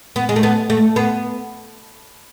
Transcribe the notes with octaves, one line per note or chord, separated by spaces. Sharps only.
B3
G#3
A3
B3
A3
B3